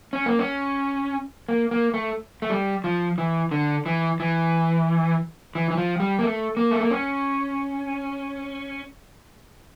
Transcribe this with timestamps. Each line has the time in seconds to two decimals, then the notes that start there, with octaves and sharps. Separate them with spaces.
0.13 C#4
0.26 A#3
0.39 C#4
1.49 A#3
1.71 A#3
1.94 A3
2.42 A3
2.50 G3
2.84 F3
3.18 E3
3.51 D3
3.86 E3
4.20 E3
5.55 E3
5.71 E3
5.78 F3
6.00 G3
6.19 A#3
6.23 A3
6.57 A#3
6.71 A3
6.81 A#3
6.91 C#4